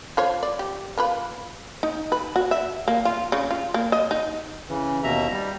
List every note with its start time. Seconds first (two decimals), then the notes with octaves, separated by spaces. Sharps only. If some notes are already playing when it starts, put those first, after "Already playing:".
0.17 F4 C5 C#5
0.43 D5
0.59 G4
0.98 A#3 F4 B4
1.83 D#4
2.12 B4
2.36 F#4
2.51 E5
2.88 A#3
3.05 F4
3.32 C#3
3.51 F4
3.74 A#3
3.92 D#5
4.11 D#4
4.69 C#3 E3
5.04 D#2 B2 E5 A#5
5.31 G3